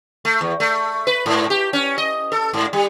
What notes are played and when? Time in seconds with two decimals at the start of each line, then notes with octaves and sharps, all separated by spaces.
0.25 A3
0.41 E2
0.60 A3
1.07 B4
1.26 G#2
1.50 G4
1.73 C#4
1.98 D#5
2.32 A4
2.53 G#2
2.73 G3